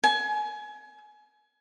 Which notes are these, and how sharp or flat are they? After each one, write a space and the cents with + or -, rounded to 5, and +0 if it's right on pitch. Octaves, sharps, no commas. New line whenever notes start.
G#5 +25